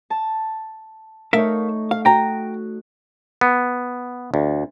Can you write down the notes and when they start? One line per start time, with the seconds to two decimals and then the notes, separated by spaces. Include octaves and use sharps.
0.10 A5
1.33 A3 D#4 A#4 C#5 E5 F5
1.91 F5
2.05 F#4 G5 A#5
3.41 B3
4.34 D2